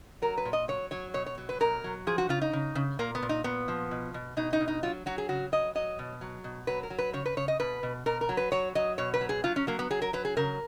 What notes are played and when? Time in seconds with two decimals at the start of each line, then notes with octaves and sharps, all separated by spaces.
0.22 F#3 A#4
0.37 B4
0.45 A#2
0.53 D#5
0.68 F#3 C#5
0.91 F#3 C#5
1.14 B2 C#5
1.26 C#5
1.38 F#3
1.49 B4
1.60 B2 A#4
1.84 F#3
2.07 F3 G#4
2.18 F#4
2.29 C#3 F4
2.42 D#4
2.53 C#3
2.75 C#3
2.99 A#2 A#3
3.15 B3
3.22 A#2
3.29 D#4
3.44 A#2 B3
3.68 F3
3.91 B2
4.14 B2
4.37 B2 D#4
4.53 D#4
4.60 B2
4.68 D#4
4.83 F#3 F4
5.06 F#3 F#4
5.18 G#4
5.29 C#3 F#4
5.52 F#3 D#5
5.75 F#3 D#5
5.99 B2
6.21 F#3
6.44 B2
6.67 F#3 B4
6.83 A#4
6.90 F#3
6.98 B4
7.13 C#3 C#5
7.26 B4
7.37 C#3 C#5
7.48 D#5
7.60 B2 B4
7.83 B2
8.06 B2 A#4
8.21 A#4
8.29 F#3
8.37 B4
8.52 F#3 C#5
8.75 F#3 D#5
8.98 B2 C#5
9.14 B4
9.21 F#3
9.29 G#4
9.44 F#3 F4
9.56 C#4
9.67 F#3 A#3
9.79 B3
9.90 F#3 G#4
10.02 A#4
10.13 F#3 B4
10.25 G#4
10.37 C#3 A#4